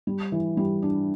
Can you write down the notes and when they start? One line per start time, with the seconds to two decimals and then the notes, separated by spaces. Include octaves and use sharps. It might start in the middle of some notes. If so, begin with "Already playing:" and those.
0.07 G3
0.32 E3
0.57 G3
0.82 D4